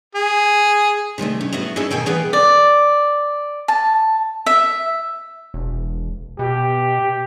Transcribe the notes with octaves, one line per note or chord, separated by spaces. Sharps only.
G#4
C3 D#3 G#3 A3
C#4
A2 B3 E4 F#4
C#4 D#4 E4 G#4 A4
D2 B2 D#3 G5 G#5
E3 B3 G#4 B4 F#5 G5
D5
A5
E5
E1
B2 G4